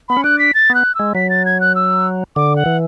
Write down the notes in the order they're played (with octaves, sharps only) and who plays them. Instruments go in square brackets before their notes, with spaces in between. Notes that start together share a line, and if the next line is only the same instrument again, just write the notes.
[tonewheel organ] B3 [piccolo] B5
[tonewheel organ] C#4
[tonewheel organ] D4 [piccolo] F#6
[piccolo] B6
A6
[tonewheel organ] B3
[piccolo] F#6
[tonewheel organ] G#3 [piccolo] E6
[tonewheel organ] F#3 [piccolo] B6
[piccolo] A6
G#6
F#6
E6
[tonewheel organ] D3 [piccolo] D6
[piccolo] F#5
[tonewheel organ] E3